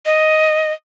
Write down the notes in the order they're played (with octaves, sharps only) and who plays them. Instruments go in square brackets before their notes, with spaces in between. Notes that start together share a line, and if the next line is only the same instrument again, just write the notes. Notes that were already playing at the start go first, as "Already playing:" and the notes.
[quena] D#5